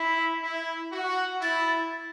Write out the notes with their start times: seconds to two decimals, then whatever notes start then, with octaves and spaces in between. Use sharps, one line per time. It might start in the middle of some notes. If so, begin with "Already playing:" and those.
Already playing: E4 B6
0.42 E4
0.92 F#4
1.41 E4 A6